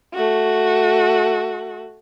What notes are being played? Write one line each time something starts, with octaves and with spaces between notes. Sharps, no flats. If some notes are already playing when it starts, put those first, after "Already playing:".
A3 F#4